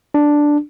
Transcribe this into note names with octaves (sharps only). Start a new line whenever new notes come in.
D4